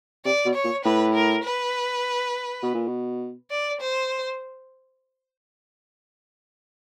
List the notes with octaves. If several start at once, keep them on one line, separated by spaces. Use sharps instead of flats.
C3 D5
B2
C#5
A#2
A2 B4
A#4
B4
B2
A#2
B2
D5
C5